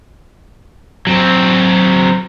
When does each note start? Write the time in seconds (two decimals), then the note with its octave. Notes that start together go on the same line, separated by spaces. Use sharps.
1.07 F#3 C4